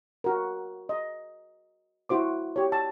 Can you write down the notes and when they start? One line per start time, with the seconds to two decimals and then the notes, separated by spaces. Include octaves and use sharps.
0.24 F#4 A#4
0.89 D#5
2.09 E4 F#4 C5 D6
2.56 G4 C#5
2.72 A5